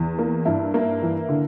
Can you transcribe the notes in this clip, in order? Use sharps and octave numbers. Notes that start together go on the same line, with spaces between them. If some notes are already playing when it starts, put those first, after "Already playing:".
Already playing: E2
A#3
G2 E4
A#3
E3
D3